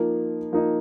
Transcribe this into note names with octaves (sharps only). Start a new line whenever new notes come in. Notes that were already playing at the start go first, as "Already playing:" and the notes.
Already playing: F3 A#3 D#4
F3 A#3 D#4